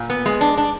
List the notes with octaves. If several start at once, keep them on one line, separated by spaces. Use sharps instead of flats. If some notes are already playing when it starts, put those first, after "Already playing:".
Already playing: A#2
B3
G#3
D4
D4